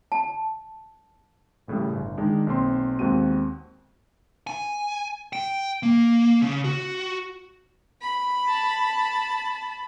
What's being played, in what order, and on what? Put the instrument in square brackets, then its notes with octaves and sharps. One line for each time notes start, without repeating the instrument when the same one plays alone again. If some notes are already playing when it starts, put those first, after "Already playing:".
[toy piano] A5
[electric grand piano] A1 A2 C#3 G3
G1
D#3 G#3 D4 D#4
B1 A#3 C4 C6
D#2 G#3 B3 C4 F#4 D#7
[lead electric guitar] G#5
G5
A#3
C#3
F#4
[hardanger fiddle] B5
[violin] A5